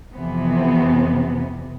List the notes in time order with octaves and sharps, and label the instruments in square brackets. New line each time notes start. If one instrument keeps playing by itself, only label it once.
[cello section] F2 C3 E3 B3